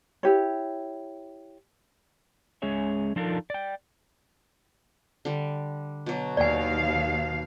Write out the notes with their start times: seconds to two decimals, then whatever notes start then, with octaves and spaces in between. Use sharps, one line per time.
0.23 E4 G4 C#5
2.62 G#3 C#4 G#4 C#5 E5
3.16 F3 D4 D#4 F4 A4 A#4
3.50 D5 G5
5.25 D3 G3
6.06 B2 F#3
6.37 D#2 D5 F5 G#5